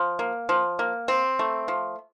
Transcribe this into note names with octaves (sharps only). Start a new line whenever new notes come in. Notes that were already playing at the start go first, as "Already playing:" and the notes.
Already playing: F3
A#3
F3
A#3
C4
A3
F3